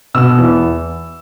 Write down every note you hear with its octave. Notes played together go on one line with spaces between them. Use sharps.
B2 E6
E2